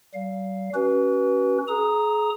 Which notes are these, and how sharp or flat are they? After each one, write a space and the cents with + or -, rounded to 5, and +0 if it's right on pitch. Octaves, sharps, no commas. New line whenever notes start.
G3 -40 F5 +0
C#4 +5 F#4 +35 B4 -20
G#4 +35 A#5 +0 D#6 +0